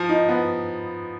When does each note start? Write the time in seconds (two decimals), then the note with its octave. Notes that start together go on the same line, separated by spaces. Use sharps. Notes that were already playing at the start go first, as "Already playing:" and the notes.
Already playing: F3
0.09 D#4
0.29 B3